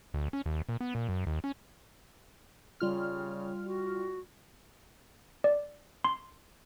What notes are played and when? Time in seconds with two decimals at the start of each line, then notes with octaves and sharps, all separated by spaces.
0.14 D2
0.33 C#4
0.46 D#2
0.69 A#2
0.81 B3
0.95 A#2
1.09 F#2
1.27 D#2
1.44 C#4
2.80 C#3 G3 F4 F6
3.66 F#4
5.44 D5
6.04 C6